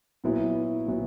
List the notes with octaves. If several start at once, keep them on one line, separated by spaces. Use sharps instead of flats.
A#2 F#3 B3 E4
A#2 F#3 B3 E4